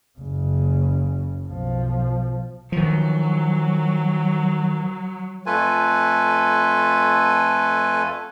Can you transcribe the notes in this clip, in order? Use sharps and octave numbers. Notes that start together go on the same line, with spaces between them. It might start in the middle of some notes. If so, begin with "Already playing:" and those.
F#1 C#3
B1 F3
D#3 F3 F#3
F2 A3 F4 A4 B4 G#5